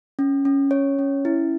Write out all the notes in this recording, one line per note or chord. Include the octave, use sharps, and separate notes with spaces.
C#4
C#4
C#5
C#4
E4